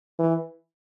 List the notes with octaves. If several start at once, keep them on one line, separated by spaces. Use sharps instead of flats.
E3